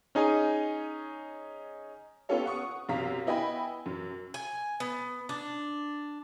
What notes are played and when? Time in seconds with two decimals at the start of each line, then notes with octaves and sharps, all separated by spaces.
0.15 C#4 D#4 G#4 G#5
2.29 B3 C#4 F4 G4 A4 C#5
2.46 F#5 C#6 D#6
2.89 B1 F#2 C3 F5 A#5 B6
3.26 B3 E4 D#5 G5 G#5 B5
3.86 F#2
4.34 G#5
4.80 B3
5.29 D4